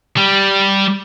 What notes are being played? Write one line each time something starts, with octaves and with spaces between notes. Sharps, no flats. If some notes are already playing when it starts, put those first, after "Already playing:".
G3